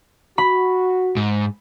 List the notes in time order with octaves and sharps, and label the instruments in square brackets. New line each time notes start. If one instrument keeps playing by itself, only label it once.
[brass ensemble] F#4 [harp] B5
[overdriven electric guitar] G#2